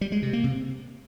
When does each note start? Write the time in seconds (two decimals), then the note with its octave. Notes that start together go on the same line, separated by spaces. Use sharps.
0.01 G3
0.12 G#3
0.23 C3
0.33 A#3
0.44 C3